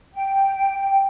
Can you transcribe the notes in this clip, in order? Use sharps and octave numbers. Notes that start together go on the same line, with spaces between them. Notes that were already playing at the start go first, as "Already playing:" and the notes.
G5